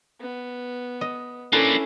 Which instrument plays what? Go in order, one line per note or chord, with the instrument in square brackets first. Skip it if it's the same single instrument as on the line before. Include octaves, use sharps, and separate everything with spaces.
[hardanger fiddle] B3
[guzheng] D#5
[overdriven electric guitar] A#3 D4 [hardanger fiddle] C#4 [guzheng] E4 A4 B4